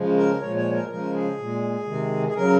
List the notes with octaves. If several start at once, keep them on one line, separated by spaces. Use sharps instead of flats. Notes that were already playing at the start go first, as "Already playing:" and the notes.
Already playing: C#3 F3 G#3
A#4
A#2 F3 G#3 C#5
C#5
A#4
C#3 F3 G#3 A#4
G#4
A#2 G#3
C3 D#3 G#3
G#4
C#3 F#3 A#4